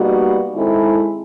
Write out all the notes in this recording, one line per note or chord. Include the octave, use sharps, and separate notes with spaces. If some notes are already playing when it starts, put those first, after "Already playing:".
Already playing: B2 G3 A#3 D#4 F#4
D#3 G#3 C4 E4 A4